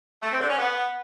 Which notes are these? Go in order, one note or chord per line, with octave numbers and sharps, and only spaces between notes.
A3
C4
D3
C#4
B3